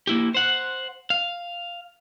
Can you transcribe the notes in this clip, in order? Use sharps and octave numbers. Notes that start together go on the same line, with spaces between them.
A#3 E4 G4
C5 F#5
F5